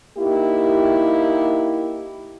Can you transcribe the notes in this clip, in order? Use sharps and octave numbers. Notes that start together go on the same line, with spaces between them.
A#3 D#4 E4 G4